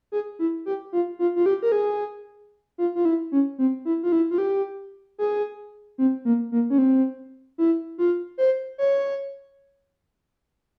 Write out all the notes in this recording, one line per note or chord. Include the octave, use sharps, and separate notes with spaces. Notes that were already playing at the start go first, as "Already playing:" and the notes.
G#4
E4
G4
F4
F4
F4
G4
A#4
G#4
F4
F4
E4
C#4
C4
E4
F4
E4
F4
G4
G#4
C4
A#3
A#3
C#4
C4
E4
F4
C5
C#5